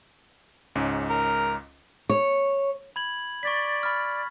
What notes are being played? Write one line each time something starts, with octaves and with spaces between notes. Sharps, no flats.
C#2 G#2 C#4
A#4
C#5
B5 G#6 F#7
D5 C#6 A6 B6
B5 F6